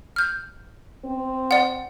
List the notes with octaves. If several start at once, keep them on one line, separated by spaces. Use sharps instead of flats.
F6 G6
C4
D5 F#5